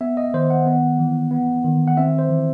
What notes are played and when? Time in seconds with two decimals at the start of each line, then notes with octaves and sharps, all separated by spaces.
0.01 B3 E5
0.17 D#5
0.34 D#3 C5
0.50 F#5
0.66 B3
0.99 E3
1.31 B3
1.64 D#3
1.88 F#5
1.97 C4 E5
2.19 C5
2.29 E3